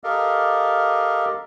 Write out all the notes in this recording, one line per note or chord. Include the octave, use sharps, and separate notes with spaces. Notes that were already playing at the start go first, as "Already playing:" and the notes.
G4 A4 A#4 D#5 F5